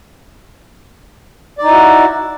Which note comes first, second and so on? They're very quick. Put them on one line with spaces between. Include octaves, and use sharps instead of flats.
D5 D#4 E4 F#4